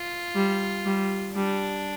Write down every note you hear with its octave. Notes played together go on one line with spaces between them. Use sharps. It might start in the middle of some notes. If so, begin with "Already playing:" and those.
Already playing: F4
G3
G3
G3 D4